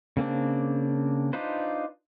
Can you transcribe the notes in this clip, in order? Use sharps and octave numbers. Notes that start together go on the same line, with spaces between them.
C#3 A#3 C4 D4
D4 D#4 F4 B4 C5